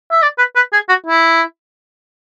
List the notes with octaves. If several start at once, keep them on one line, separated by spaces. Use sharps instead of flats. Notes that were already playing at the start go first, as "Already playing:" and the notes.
E5
D5
B4
B4
G#4
F#4
E4